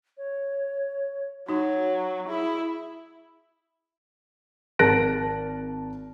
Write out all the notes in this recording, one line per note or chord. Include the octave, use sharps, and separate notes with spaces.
C#5
F#3 D#4 F#4 C#5
E4 G#4
G#1 A#4 A5 F#6 A#6 D7